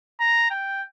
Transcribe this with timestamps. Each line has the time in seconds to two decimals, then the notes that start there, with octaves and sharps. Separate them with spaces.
0.20 A#5
0.50 G5